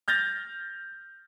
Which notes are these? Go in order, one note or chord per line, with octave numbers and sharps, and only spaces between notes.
F6 G6 A6 A#6 F7